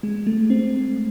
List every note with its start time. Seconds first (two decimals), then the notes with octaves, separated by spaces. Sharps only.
0.03 G#3
0.27 A3
0.50 C4